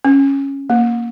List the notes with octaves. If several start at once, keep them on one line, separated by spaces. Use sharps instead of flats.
C#4
A#3